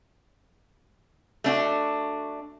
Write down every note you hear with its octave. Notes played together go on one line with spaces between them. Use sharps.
A3 D4 F#4